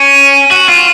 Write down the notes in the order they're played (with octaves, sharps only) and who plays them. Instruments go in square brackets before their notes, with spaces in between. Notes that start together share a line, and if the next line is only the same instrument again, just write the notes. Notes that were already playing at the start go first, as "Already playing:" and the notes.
Already playing: [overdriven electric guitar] C#4
F#4
F4